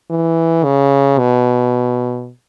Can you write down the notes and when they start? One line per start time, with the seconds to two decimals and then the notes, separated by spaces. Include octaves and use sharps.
0.10 E3
0.64 C#3
1.18 B2